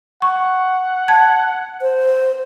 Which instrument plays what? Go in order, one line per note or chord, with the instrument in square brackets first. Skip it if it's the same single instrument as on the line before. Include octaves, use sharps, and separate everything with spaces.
[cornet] F#5 [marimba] C#6
[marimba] A5 G#6
[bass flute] C5